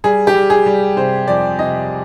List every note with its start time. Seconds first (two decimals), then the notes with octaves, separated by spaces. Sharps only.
0.04 G3 G#4
0.27 G4
0.34 G3
0.50 G#4
0.66 G3
0.97 C3 C5
1.28 F2 D5
1.59 C3 D#5